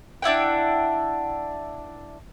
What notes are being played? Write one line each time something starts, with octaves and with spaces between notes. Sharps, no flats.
D4 E4 F#5 G5